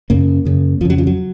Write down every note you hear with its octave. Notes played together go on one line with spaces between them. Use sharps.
F#2 C#3 A#3
F#2 C#3
F2 C#3 F3 F#3
F3
F#3